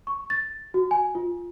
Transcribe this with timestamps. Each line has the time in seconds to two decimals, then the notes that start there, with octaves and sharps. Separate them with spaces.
0.07 C#6
0.30 A6
0.74 F#4
0.91 G#5
1.15 F4